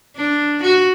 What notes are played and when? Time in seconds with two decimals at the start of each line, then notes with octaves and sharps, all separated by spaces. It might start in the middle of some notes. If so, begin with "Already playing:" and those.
0.16 D4
0.64 F#4